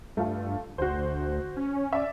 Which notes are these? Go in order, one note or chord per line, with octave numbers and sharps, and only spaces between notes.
G2 A3 F4 A4
D2 F#4 C5
C#4
D5 E5